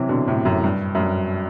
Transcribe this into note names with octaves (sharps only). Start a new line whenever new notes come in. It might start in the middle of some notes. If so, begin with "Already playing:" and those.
Already playing: C3 E3 F#3
B2 D3
A2 C3
F#2 A2
G2
F#2
G2